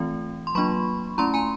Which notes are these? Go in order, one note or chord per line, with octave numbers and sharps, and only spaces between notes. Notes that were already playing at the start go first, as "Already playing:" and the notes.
Already playing: E3 A3 C4 F4
C6
F#3 A#3 D4 F4 B5 C#6
A3 C#4 E4 A#5 C6
G#5 A#5